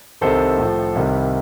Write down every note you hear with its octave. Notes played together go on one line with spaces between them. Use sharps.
C2 C3 D#3 A4 C5
A2 F3
C2 C3 D#3 G3